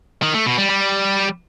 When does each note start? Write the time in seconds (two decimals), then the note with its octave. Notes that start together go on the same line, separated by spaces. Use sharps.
0.22 D#3
0.34 A3
0.46 B2
0.58 G3
0.70 G3